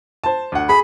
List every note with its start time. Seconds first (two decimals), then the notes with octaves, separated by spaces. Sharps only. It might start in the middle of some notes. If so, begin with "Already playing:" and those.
0.24 C5 A5
0.52 D2 F#5
0.69 G#4 B5